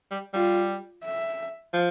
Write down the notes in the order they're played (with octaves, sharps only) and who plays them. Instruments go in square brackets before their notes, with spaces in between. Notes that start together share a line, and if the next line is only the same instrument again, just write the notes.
[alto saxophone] G3
[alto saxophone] G3 [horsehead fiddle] F4
[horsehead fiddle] E5
[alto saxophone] F3